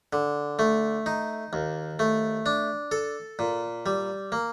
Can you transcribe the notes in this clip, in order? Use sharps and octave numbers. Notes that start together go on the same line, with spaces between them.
D3
A3
D#4
D#2
A3
D4
A4
A#2
G3
A#3